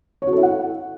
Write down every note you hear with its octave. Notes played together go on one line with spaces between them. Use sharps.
C#5
F#4
A4
E4
F#5